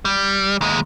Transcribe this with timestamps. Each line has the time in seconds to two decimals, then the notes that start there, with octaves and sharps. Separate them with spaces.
0.05 G3
0.61 D#2 G#3